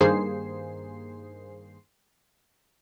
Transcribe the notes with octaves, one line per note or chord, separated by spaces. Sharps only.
G2 D#3 A#3 G#4 C5 C7